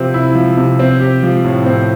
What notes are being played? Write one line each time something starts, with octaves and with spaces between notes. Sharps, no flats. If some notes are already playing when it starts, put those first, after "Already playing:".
Already playing: C3 F3 C4
E4
F3
C3
C4
G4
F3
A2
C4